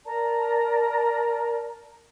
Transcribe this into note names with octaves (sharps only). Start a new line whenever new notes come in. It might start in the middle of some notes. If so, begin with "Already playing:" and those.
A#4 D5 A5 A#5